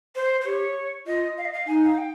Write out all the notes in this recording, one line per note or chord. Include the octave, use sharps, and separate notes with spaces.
C5
C5
G4 C#5
F4 D#5
F5
D#5
F5
D#4 G#5
F5
G5